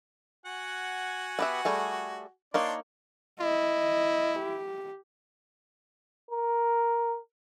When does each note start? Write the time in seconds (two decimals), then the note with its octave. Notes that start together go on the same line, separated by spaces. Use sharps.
0.46 F#4 F#5 G#5
1.39 B3 G4 E5
1.65 G3 A3 G#4
2.54 A#3 D4 D#4 C#5 D5 C6
3.41 E4 D#5
4.38 G4
6.31 A#4